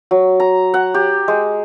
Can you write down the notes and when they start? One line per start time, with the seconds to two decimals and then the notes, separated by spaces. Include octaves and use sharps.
0.11 F#3
0.40 A#5
0.74 F#5
0.94 G4
1.28 G#3